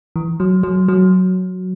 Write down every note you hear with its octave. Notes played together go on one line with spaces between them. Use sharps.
E3
F#3
F#3
F#3